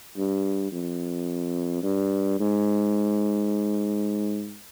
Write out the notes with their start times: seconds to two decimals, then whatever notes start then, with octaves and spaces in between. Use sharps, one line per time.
0.17 G2
0.72 F2
1.83 G2
2.39 G#2